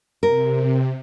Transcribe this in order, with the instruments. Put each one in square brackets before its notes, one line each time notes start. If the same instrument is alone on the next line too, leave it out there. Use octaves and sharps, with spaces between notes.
[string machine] C3 [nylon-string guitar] A#4